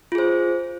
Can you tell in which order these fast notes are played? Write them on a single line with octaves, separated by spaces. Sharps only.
F4 G#4 C5